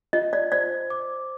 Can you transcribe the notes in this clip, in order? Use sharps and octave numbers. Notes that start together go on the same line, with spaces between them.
F4 D#5
D5
C5 D5
D6